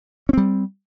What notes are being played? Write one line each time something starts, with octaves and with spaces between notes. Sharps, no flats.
G3 C4 C#4